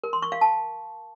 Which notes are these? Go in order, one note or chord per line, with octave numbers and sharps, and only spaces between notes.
A#4
C6
C#6
F5
A5